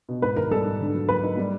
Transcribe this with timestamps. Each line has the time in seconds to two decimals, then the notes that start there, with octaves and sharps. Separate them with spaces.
0.09 B2
0.22 G#2 B4
0.36 D#3 A#4
0.51 G3 A4
0.65 G#2
0.80 D3
0.95 F#3
1.09 A#3 B4
1.23 D#4
1.37 G3